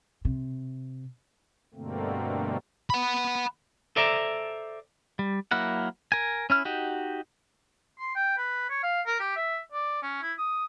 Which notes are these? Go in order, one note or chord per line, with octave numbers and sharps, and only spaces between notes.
C3
G2 B2 D3 A3 A#3 C4
F#5 B5
A4 C5 D5 E5 A5 A#5
G3
F#3 A#3 E4 A#4 F#5
A#4 G#5
C#4 E4 F6
D#4 F#4 G4
C6
G5
B4
C#5
F5
A#4
G4
E5
D5
C#4
E4
D#6